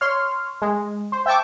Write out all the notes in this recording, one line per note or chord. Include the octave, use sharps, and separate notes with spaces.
C#5 C6 F6
G#3
C5
E5 G5 A5 C#6 D6